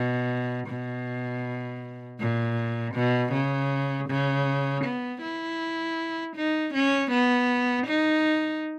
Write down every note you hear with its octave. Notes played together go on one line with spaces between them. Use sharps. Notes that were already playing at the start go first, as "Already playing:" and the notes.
Already playing: B2
B2
A#2
B2
C#3
C#3
B3
E4
D#4
C#4
B3
D#4